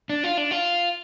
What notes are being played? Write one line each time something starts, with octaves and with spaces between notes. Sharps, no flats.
D4
F4
D4
F4